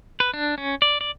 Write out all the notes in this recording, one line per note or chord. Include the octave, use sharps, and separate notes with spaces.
B4
D4
C#4
D5
D5